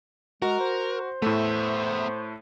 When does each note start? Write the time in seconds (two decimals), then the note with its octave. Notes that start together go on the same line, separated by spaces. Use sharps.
0.42 G#3 F#4 A#4
0.60 C5
1.22 A2 A3 B3 E5